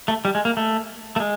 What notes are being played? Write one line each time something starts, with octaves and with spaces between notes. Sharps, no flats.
A3
G3
G#3
A#3
A3
A3
G#3